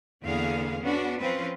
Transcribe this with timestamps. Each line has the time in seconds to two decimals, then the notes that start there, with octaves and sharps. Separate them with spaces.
0.24 E2 D3 A#3 B3 G#4 F5
0.81 B3 C#4 D4 F#4
1.20 F3 C4 C#4 F4 B4